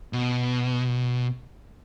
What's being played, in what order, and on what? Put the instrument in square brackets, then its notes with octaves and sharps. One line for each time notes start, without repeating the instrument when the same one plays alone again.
[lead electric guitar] B2